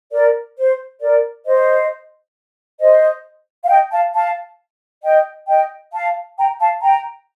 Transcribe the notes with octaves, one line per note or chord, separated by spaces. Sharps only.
A#4 D5
C5
A#4 D5
C5 D#5
C5 D#5
F5
D#5 G5
F5 A5
F5 A5
D#5 G5
D#5 G5
F5 A5
G5 A#5
F5 A5
G5 A#5